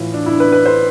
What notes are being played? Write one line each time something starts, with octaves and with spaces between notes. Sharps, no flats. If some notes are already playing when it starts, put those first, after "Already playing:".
Already playing: A2 E3 F4
D4
E4
B4
B4
C5